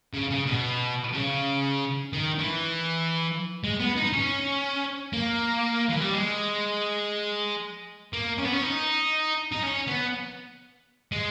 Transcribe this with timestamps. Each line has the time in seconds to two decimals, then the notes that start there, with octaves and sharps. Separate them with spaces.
0.14 C#3
0.31 C#3
0.47 B2
1.13 C#3
2.13 D#3
2.39 E3
3.64 G#3
3.80 B3
3.96 D#4
4.13 C#4
5.13 A#3
5.89 E3
6.01 G3
6.14 G#3
8.13 A#3
8.38 C#4
8.45 B3
8.53 C#4
8.63 D#4
9.52 D#4
9.63 C#4
9.87 B3
11.12 G#3